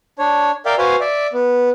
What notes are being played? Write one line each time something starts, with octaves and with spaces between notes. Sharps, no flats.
D4 C#5
A#4 D5 E5 F5 G5
F#4 B4 C5 F5 G#5
D5 E5
B3